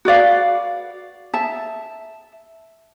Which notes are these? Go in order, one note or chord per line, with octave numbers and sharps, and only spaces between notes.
F#4 B4 D5 F5
E5 A5